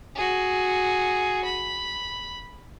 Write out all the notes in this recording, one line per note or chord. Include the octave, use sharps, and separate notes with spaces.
F#4 G#4
B5